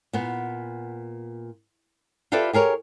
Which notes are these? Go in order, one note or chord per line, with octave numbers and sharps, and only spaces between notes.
A#2 B3
F4 G4 A4 B4 D5 E5
G4 G#4 A#4 C#5